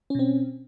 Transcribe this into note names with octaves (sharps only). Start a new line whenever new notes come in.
B2 C4 C#4